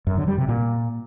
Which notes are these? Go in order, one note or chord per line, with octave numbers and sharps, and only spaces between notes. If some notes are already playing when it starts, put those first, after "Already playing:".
F#2
D3
G3
C3
A#2